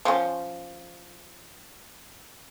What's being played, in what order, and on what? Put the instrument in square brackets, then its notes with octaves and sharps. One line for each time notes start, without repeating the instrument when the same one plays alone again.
[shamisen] F3 C#4